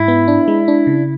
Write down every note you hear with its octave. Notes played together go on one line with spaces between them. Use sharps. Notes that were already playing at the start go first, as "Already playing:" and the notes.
Already playing: G#2 E4
B3
D4
G#3
D4
C#3